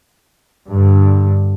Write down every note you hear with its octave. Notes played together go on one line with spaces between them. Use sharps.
G2 D3